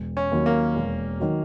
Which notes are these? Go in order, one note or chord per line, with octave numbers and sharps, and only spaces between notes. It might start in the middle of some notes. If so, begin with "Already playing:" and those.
Already playing: E1
C#4
D#2 D#3 F#3
A#3
E1
D#3 F#3